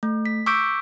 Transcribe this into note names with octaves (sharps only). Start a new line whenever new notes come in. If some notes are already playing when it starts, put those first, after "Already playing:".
A3
B6
C#6 D6 E6 G6 B6 D7